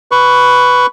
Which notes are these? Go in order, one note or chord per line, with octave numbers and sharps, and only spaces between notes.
B4 C#6